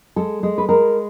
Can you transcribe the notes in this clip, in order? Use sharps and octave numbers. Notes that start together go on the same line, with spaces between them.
G#3 A4
G#3
B4
G#3 A#4